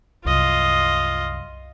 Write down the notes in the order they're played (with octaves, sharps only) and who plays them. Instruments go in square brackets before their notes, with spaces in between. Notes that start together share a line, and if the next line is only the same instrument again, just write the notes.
[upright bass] C2 F#2 [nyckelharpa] F4 D#5